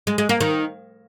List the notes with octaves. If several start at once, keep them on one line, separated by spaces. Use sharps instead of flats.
G#3
G#3
A#3
D#3